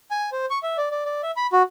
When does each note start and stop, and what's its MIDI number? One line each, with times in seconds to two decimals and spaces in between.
0.11 0.30 80
0.32 0.46 72
0.50 0.59 85
0.63 0.77 76
0.77 0.89 74
0.91 1.05 74
1.05 1.21 74
1.23 1.31 76
1.37 1.47 83
1.53 1.62 66